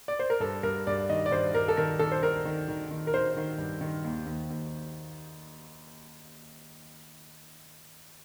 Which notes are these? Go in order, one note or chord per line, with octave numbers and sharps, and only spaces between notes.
D5
C5
A#4
G2 A4
G2 A#4
G2 D5
D#3 D#5
D5
G2 C5
G2 A#4
A4
D#3 A#4
D#3 A4
C5
D#3 A#4
D#3
D#3
D#3
A#4
D#3 C5
D#3
G2
D#3
D#2
D#2
D#2